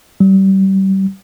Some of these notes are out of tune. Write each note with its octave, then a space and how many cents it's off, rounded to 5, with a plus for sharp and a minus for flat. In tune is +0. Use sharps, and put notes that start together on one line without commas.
G3 -30